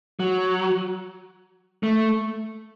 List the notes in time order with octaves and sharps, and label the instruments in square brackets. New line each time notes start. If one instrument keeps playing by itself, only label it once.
[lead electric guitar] F#3
A3